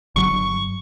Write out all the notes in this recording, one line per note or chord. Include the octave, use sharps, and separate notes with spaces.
G1 F#3 C#6